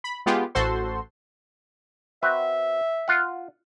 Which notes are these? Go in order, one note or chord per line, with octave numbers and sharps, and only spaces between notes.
B5
G#3 B3 F4 G4 G#4
A1 F#4 A4 C5 C6
C4 F#4 B4 E5
F4 F#5